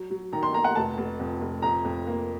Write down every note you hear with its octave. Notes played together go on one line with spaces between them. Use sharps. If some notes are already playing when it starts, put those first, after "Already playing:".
Already playing: F#3
F#3
D#3 A#5
C6
A#3 A#5
F#5
F1 A5
F1
F2
F1
F2 A#5
F2
A#3